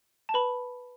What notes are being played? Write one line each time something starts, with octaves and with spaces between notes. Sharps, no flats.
A5
B4 B5